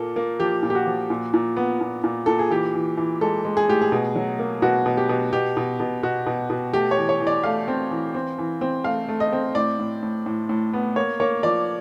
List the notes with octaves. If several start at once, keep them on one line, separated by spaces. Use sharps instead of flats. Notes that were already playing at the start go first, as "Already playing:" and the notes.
Already playing: A#2 A#3 A4
A#3
F3 G4
A#2
G4
F#4
F3
A#2
A#2
B3
A#2
A#2
A#2 A4
G#4
E3 G4
E3
E3
G#3 A4
G#3
G#4
A2 G4
G#4
B2
F#3
A#3
B2 F#4
B2
G4
B2
B2 G4
B2
B2
B2 F#4
B2
B2
A3 G4
C#5
E3
C#5
E3
D5
A3 F5
C4
E3
C4
E3
C4
A3 F5
A3
D#5
C4
A2 D5
A2
A2
A2
A2
B3
A#3 C#5
A#3 C#5
F3 D5